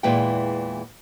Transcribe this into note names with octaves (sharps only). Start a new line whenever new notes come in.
E2 A#2 E3 G#3 E4 G5